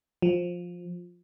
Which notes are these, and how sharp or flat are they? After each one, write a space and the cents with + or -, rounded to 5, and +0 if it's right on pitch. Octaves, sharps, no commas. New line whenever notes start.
F3 +10